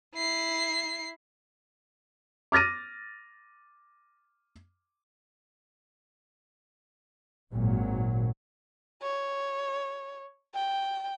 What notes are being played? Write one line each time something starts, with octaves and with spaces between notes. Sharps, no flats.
E4 C7
D6 F6 A6 A#6 D#7
G#1 A#2 F#3
C#5
G5